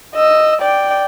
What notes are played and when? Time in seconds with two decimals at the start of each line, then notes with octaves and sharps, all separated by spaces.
0.15 D#5 E6
0.61 D5 G5